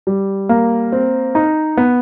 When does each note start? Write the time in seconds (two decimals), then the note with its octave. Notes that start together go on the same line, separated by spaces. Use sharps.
0.07 G3
0.49 A#3
0.92 C4
1.35 D#4
1.77 B3